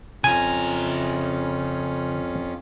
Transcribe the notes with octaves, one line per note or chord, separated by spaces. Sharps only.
F2 C#3 C#4 F4 G#5 A#5